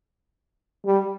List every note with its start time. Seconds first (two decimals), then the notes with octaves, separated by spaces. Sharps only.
0.85 G3